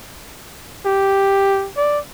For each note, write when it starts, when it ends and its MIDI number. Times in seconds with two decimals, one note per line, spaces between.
0.85 1.69 67
1.77 1.99 74